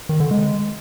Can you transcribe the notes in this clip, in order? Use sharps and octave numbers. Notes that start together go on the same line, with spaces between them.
D#3
D3
G#3